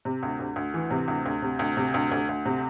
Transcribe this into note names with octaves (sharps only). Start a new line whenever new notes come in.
C3
D2
D2
D2
E3
C3
D2
D2
C3
D2
C3
D2
D2
D2
C3